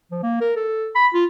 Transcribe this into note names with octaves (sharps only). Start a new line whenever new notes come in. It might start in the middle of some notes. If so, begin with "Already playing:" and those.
F3
A#3
A#4
A4
B5
F4